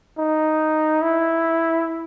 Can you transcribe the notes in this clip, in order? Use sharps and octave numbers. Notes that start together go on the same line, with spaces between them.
D#4
E4